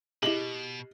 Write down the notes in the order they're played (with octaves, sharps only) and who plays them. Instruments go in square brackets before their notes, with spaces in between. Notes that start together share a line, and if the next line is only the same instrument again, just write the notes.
[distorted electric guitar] B2 [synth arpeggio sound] E4 G#4 [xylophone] G4 D#5 G7 [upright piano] F#7